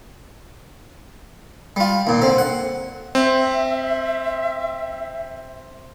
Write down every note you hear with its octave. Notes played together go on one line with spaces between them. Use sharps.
G3 F4
D#2 A#2
D3 C4
F#5
C4 E5